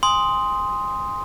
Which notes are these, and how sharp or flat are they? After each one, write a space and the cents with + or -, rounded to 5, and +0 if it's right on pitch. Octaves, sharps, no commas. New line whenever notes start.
G#5 -30 C6 +0 D#6 +10